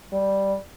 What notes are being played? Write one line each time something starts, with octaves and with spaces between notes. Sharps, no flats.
G3